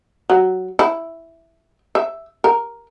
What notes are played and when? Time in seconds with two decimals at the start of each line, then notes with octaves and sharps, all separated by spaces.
0.30 F#3
0.79 E4
1.95 E5
2.44 A#4